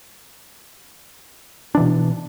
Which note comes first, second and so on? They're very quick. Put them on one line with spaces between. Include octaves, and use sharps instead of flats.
D4 E3 B2